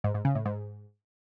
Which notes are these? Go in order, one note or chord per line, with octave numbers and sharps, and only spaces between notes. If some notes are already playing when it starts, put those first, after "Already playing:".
G#2
G#2
C#3
A2
G#2